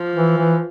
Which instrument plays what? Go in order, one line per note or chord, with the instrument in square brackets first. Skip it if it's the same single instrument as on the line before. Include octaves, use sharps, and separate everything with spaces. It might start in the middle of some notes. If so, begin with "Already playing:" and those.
Already playing: [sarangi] F3
[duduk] E3
E3